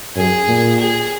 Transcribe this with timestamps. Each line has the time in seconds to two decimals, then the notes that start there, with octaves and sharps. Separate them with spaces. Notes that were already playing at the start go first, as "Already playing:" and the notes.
0.16 F#2 G#4
0.48 A#2
0.79 G#4